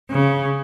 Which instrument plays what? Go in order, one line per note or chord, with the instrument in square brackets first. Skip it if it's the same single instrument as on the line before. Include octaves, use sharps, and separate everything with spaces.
[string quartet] C#3